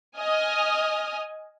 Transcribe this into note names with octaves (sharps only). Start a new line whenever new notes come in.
D#5 G#5 D#6 F6